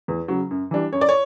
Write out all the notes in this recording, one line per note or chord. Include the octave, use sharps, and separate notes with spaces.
E2
C#3 F#3
F#2
E3 G3 D4
F#2 C#5
D5
C#5